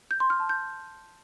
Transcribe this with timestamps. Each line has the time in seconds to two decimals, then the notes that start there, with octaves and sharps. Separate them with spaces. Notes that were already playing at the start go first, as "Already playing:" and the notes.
0.11 G6
0.20 C6
0.30 F6
0.40 A5
0.49 G6